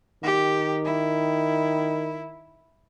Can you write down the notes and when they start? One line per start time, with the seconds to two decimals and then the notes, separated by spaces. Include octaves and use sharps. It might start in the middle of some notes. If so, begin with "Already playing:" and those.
0.23 D#3 G4
0.85 E4